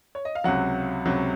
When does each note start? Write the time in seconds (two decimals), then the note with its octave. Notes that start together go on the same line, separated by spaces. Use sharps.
0.15 C#5
0.25 D#5
0.35 F5
0.44 C#2 C3 F#3 F#5
1.05 C#2 C3 F#3